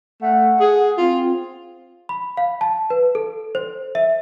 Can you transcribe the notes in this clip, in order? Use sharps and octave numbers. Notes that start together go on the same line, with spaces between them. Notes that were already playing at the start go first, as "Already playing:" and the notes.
A3 F#5
G#4
C4 F4
B5
F5
A5
B4
A4
C5
E5